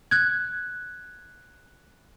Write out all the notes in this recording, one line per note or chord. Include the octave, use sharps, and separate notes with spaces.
F#6 G#6